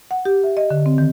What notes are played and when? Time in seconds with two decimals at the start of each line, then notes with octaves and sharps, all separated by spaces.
0.11 F#5
0.25 G4
0.44 E5
0.57 D#5
0.70 D3
0.86 C4
0.98 D#3